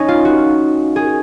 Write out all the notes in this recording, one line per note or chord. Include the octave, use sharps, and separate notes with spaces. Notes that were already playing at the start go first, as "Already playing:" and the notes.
Already playing: C#4 D#4
F4
F#4
G#4